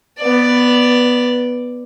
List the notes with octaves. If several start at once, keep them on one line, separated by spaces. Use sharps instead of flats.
B3 D5